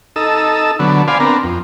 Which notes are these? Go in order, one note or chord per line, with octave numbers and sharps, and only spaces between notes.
D#4 A4 E6
D3 F#3 B3
C5 D5 F5 G#5 B5
B3 C4 D4 A#4
F2